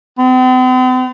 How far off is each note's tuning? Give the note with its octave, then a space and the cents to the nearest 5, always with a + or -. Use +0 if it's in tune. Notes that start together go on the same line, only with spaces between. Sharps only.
C4 -45